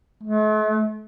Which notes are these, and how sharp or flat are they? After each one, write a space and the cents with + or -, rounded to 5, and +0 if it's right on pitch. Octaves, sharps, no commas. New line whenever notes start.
A3 -45